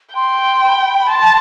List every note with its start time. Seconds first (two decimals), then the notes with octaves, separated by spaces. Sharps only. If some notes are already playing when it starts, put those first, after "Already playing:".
0.15 G5 C6
0.63 C6
0.68 B5
1.10 A5 C6